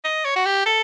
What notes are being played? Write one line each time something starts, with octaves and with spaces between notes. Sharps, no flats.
D#5
C#5
F#4
G4
A4